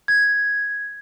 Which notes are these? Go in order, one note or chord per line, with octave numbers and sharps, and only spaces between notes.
G#6